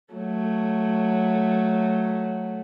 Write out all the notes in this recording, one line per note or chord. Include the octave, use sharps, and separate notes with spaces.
F#3 A3